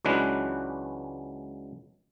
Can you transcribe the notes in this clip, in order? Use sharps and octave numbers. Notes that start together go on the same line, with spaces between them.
C#2 E3 F#3 G#3 D4 B4